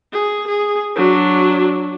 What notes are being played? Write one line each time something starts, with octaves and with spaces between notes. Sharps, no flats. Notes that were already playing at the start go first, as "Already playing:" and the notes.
G#4
G#4
F#3 D4